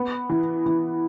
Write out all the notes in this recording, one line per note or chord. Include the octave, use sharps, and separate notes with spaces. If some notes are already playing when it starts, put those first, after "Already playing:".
Already playing: B3
E3
E3